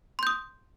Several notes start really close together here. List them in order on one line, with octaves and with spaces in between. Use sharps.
C6 G6 D#6